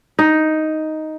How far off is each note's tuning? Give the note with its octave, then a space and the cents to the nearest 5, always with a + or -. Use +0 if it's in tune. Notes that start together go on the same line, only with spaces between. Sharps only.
D#4 +5